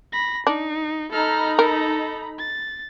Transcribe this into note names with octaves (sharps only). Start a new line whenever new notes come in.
B5 A#6
D4 D#4
D#4 A4 A#5 B5 F6
A4 A#4
A6